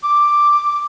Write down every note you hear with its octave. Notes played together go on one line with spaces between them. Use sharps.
D6